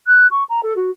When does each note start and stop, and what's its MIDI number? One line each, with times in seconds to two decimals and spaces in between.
0.06 0.26 90
0.31 0.43 85
0.49 0.60 82
0.63 0.74 69
0.76 0.90 66